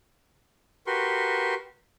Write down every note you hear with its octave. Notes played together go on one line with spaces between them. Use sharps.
F#4 G4 A#4 B4 C6 C#6